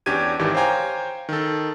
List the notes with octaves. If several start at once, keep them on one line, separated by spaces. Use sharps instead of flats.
E2 C#4 D4 G4 G#6 D#7
G#1 D#3 E3 G4 D6
C5 C#5 F5 G5 G#5 A#5
D#3 A4